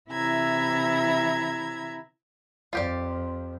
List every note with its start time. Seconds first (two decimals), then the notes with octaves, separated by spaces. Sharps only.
0.10 C3 E3 E4 E5 A#5 G#6
2.73 F2 F4 G4 D5